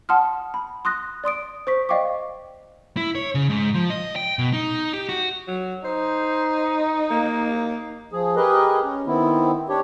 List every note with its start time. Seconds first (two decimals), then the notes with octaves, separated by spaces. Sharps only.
0.09 F#5 A5 C6 D#6 F6
0.54 B5
0.85 C6 D#6 F#6 A#6
1.24 D5 C6 D#6 D7
1.67 C5 C#6 B6
1.89 D5 D#5 F5 G5 C#6 D6
2.97 E4
3.15 C#5
3.35 C#3
3.49 G#2
3.74 F3
3.90 D#5
4.16 G5
4.39 B2
4.53 D#4
4.93 G4
5.09 F#4
5.47 F#3
5.85 D#4 C5
7.11 A#3
8.13 F3 G#4
8.36 G4 G#4 A#4 B4 D#5
8.84 C#4
9.07 D#3 B3 C4 E4
9.69 D4 G4 C#5